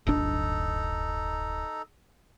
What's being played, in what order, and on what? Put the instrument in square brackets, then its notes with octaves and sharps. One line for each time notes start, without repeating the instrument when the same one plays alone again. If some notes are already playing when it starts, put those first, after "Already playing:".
[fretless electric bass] D1 G1 D4 [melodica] D#4 A4 A#5